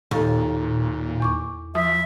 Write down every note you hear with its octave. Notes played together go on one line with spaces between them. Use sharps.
D#2 A#2 G4 A4
E2 C#6 D6
F3 E5 D#6